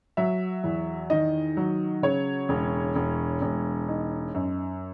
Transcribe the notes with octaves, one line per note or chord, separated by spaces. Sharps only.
F#3 E5
E2
D#3 D#5
F#3
C#3 C#5
E1
E1
E1
D#4
F#2